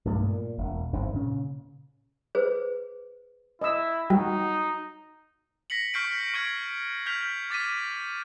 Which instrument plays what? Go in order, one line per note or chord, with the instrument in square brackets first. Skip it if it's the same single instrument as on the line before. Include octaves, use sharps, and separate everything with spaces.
[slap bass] B1 G2 A3 A#3
A#2
E1
G1 G#2 C4
A#2 C#3
[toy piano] G#4 B4 C5
[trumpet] E4 [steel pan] D#5 E6
[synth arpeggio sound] G3 [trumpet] D#4 [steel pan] F#4
[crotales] A#6 B6 C#7 F#7
C#6 F6 G6 B6 C7 D7
C#6 F6 G#6 D7
F6 G6 B6 F7
D6 A6 B6 D#7